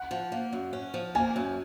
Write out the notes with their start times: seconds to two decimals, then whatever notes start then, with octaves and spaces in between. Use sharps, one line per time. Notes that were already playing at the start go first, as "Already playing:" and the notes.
Already playing: F#5
0.11 F3
0.32 A#3
0.53 F#2
0.73 C#4
0.94 F3
1.15 A#3 G#5
1.36 F#2